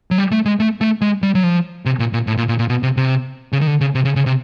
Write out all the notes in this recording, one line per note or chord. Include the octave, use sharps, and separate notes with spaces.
F#3
G3
A3
G#3
A3
A3
G#3
G3
F#3
F3
C3
A#2
A#2
A2
A#2
A#2
A#2
B2
C3
C3
C#3
D#3
D3
C#3
C3
C#3
C#3
C3